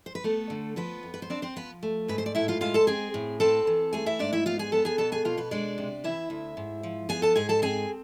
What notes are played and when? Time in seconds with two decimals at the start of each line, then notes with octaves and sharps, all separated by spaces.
0.06 C5
0.15 B4
0.24 A3 B3 A4
0.50 D3
0.76 F3 B3 B4
1.03 F2
1.14 B4
1.22 C5
1.30 C4 D4 D5
1.42 C4 C5
1.56 F3 B3 B4
1.83 A3
2.08 G#2 B4
2.18 C5
2.26 D5
2.35 A2 E4 E5
2.48 F4 F5
2.61 G#3 F4 F5
2.74 A4 A5
2.87 C4 G#4 G#5
3.14 A2
3.40 C4 A4 A5
3.67 E3
3.93 A3 G#4 G#5
4.06 E4 E5
4.19 G#2 D4 D5
4.33 E4 E5
4.46 B3 F4 F5
4.59 G#4 G#5
4.72 B3 A4 A5
4.85 G#4 G#5
4.98 B2 A4 A5
5.12 G#4 G#5
5.25 B2 F4 F5
5.37 B3 B4
5.51 G#3 D4 D5
5.78 C3
6.04 E3 E4 E5
6.30 D2
6.57 G#2
6.83 F3
7.09 B3 G#4 G#5
7.22 A4 A5
7.36 G#2 G#4 G#5
7.49 A4 A5
7.62 C4 G#4 G#5